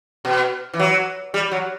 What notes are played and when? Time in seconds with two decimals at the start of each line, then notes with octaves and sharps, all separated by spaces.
0.25 B2
0.74 E3
0.80 F#3
1.34 G3
1.52 F#3